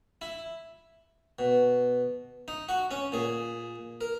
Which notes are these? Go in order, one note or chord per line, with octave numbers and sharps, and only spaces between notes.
E4
B2
D#4
F#4
C#4
A#2 G#4
A#4